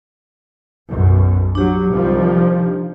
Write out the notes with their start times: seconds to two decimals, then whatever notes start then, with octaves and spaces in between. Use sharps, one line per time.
0.88 B1 F#2 B2
1.55 F#3 D4 G4
1.91 C2 D#3 F3